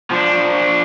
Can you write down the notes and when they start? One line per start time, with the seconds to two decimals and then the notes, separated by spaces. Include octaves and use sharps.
0.11 F3 D4